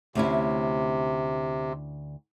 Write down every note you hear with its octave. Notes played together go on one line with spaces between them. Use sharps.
D2 C3 C#4 E4